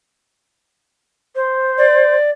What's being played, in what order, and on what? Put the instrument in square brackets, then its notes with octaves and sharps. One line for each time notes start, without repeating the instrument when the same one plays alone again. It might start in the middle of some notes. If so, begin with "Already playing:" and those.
[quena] C5
[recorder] D5